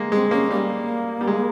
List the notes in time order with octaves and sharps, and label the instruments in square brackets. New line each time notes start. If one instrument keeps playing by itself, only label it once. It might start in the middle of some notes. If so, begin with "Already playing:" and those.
Already playing: [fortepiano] G#3 A#3
[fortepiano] G#3 [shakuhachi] C4
[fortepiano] A#3 [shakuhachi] C#4
[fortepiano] G3 [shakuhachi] A#3
[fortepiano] G3
G#3